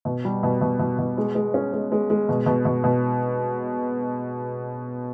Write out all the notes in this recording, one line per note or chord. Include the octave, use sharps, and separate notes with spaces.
B2
G3
B2
B2
B2
B2
G#3
G#3
C#4
G#3
G#3
G#3
B2
B2
B2
B2